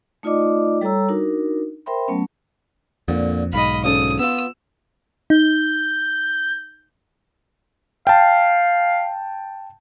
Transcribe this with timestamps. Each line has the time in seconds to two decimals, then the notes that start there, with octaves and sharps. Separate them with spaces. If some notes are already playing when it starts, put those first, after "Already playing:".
0.23 A3 D#4 F4 D5 D#5 D6
0.81 G3 A4 C#5 A#5 E6
1.09 D4 D#4 F#4 A#4
1.86 A#4 C5 E5 G5 B5 C6
2.08 F#3 A3 B3 C#4
3.08 F2 A#2 D3
3.53 B1 G#2 D#5 F5 B5
3.84 D2 C#3 A4 D#6
4.19 B3 F4 E6
5.30 D#4 G6
8.07 F5 G5 A5